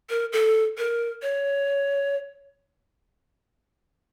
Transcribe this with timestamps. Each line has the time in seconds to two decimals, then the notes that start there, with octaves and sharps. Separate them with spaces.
0.10 A#4
0.32 A4
0.78 A#4
1.22 C#5